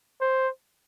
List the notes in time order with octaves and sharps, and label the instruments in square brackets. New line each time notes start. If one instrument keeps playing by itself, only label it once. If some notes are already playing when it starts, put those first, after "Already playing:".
[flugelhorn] C5